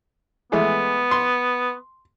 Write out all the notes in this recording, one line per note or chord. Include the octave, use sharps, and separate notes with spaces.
E3 G#3 A3 B3
C6